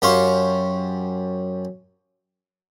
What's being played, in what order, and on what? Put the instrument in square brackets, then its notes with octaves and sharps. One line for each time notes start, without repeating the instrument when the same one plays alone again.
[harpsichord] F#2 G4 C5 F5 C#6